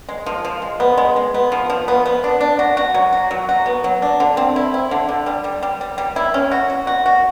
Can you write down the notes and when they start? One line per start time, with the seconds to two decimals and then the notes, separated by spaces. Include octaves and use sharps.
0.09 G#3
0.26 F3
0.45 F3
0.62 G#3
0.80 B3
0.98 G#3
1.16 G#3
1.34 B3
1.52 F3
1.70 F3
1.88 B3
2.06 B3
2.24 D4
2.41 D4
2.59 F#4
2.77 F#4
2.94 F#3
3.13 F#4
3.31 F#3
3.49 F#4
3.66 B3
3.84 F#3
4.02 D4
4.20 D3
4.37 C4
4.56 E4
4.74 E4
4.91 D3
5.09 D3
5.26 G3
5.44 G3
5.63 G3
5.81 G3
5.98 G3
6.16 E4
6.34 C#4
6.51 F#4
6.70 F#4
6.87 F#4
7.06 F#4